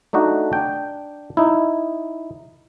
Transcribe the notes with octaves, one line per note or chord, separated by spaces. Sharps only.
A3 D4 D#4 F#4
D4 G5
D#4 E4